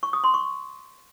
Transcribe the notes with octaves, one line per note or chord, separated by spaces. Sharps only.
C#6
D#6
C6
C#6